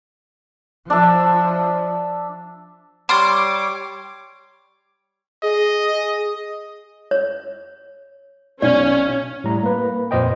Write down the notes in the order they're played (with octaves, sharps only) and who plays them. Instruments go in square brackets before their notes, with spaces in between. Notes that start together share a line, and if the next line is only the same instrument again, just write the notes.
[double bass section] F3 [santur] D4 E5
[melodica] G3 C#5 [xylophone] B5 F6 A6 [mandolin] C6 [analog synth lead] D6
[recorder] G#4 [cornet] D#5
[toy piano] C#5
[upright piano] B1 [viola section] C#4 [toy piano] D5
[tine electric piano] A2 G3 A#5
A#3 B4
F2 A#2 C5 D#5 G5